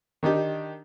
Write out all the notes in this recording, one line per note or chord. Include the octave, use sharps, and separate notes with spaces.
D#3 D4 D#4 G4